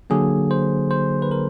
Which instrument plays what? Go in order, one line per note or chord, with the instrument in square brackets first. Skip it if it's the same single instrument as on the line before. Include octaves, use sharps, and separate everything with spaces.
[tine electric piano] D3 F#3 A#3 G#4
C5
C5
B4
A#4